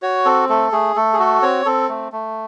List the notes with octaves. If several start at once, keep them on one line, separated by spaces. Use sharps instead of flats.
F#4 C#5
C4 A4
A3 A4
A3 G#4
A3 A4
G#4
F#4 A4
C4 C#5
C4 A4
A3
A3